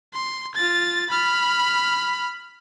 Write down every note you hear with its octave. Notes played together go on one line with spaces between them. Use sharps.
C6
F4 A6
B5 F6